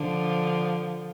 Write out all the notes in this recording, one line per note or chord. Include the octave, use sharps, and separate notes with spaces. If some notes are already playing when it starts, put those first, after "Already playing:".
Already playing: D3 F3